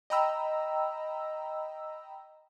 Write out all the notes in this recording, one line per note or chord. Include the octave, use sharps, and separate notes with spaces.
D#5 G5 A#5 B5 E6